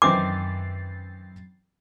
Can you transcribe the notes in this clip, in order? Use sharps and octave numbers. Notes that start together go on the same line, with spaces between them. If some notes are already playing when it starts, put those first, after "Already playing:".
F#2 D#3 E3 C4 D6 A6 C7